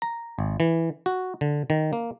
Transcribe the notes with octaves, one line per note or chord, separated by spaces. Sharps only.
A#5
G#1
E3
F#4
D3
D#3
A#3